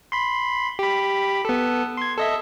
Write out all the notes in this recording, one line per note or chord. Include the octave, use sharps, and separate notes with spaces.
B5 C6
G4 B5
B3 A4
C6 G#6
A4 D#5 E5